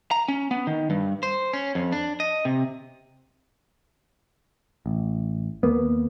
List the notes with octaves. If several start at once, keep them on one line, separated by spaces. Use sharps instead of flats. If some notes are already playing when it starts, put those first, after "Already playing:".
A#5
C#4
B3
D#3
G2
C5
C#4
F2
D4
D#5
C3
A1
D#2 A#3 B3